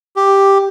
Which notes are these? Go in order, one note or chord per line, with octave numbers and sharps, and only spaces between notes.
G4